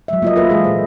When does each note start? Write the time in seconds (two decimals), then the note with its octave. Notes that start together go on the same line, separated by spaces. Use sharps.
0.08 F#3 G#3 E5
0.22 A#3 F4 D#5
0.36 F4 A4 B4 E5 F5
0.50 E3 G#3 G#4
0.64 A#2 A#3 C5